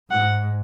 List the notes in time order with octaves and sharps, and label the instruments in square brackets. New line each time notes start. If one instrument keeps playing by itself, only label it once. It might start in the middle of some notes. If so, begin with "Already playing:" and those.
[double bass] G#2 [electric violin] F#5